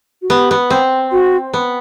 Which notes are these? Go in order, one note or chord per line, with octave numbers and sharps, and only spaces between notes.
F#4
B3 G4
B3
C4
F#4
B3